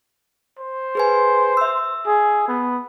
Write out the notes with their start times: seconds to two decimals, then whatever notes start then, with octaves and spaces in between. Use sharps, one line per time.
0.59 C5
0.95 G#4 B4 G#5
1.57 E5 E6
2.06 G#4
2.48 B3